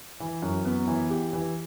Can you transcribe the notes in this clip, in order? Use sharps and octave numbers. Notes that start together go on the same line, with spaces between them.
E3
F#2
B3
E3
G4
E3